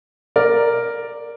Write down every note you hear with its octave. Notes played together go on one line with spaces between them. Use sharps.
A#4 D5